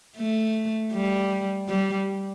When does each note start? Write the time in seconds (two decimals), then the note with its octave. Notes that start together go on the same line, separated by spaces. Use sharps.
0.17 A3
0.92 G3
1.68 G3